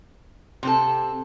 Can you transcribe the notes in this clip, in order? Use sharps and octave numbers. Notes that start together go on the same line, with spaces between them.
C3 C4 A4